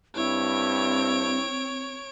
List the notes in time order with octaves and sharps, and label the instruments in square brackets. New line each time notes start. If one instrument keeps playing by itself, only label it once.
[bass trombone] G2 [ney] C4 [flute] E4 [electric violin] C#5 D7